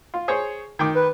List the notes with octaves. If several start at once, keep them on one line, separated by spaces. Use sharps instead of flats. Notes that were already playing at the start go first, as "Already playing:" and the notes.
F4
G#4 C5 C#5
D#3 G5 D6
B4